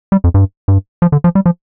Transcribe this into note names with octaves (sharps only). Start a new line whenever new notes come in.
G3
F2
G2
G2
F3
D3
F3
G3
F3